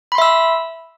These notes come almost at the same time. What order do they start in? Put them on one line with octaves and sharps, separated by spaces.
B5 C6 E5 E6